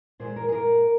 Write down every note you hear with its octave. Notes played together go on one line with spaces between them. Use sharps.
A#2 G#3 C5
A#4
G#4
A#2 G#3 A#4